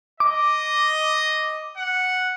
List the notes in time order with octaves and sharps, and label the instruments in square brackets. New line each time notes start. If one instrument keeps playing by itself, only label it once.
[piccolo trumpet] D#5 [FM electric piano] D6
[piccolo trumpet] F#5